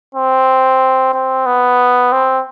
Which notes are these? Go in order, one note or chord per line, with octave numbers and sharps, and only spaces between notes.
C4
C4
B3
C4